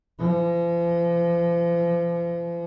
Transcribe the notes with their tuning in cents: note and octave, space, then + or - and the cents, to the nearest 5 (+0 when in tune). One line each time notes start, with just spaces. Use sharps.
F3 -40